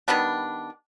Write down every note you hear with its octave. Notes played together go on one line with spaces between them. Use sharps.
D#3 G3 B3 D4